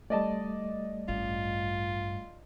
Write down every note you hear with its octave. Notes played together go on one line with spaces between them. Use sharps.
G3 A3 D5 D#5 A5
A1 G2 F4